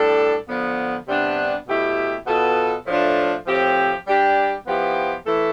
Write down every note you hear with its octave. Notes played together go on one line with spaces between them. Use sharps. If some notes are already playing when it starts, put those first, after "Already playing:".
Already playing: A2 G3 D4 A4
D3 F3 B3
C3 G3 B3 D4
B2 A3 E4 G4
B2 B3 F4 A4
A2 F3 A3 D4 F4
A2 F3 C4 G4
G3 D4 G4
F3 B3 E4 G4
E3 A3 E4 A4